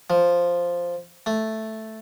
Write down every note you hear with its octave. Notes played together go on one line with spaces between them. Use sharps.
F3
A3